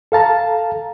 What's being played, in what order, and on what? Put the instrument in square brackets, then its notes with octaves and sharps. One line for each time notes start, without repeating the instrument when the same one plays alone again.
[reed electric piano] A4 F5 A5 A#5